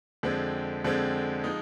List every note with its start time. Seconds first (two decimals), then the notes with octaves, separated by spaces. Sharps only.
0.23 F2 D3 G#3 C4
0.84 F2 D3 G#3 C4
1.44 F3 G#3 D#4